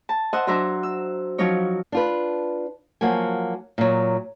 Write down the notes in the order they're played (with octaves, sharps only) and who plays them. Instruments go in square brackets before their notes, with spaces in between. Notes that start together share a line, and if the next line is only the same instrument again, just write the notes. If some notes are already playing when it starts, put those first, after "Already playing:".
[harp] A5
C5 D#5 E5 F#5
F#3 D4 C5 E5 A#5
E6
F3 F#3 C#4 D#4 C#5
[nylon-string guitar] D4 F4 B4
F3 F#3 A#3 F#4 G#5
A#2 F#3